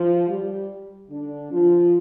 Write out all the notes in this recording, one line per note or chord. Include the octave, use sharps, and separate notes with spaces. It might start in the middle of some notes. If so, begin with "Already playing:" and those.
Already playing: F3 F4
G3 G4
D3 D4
F3 F4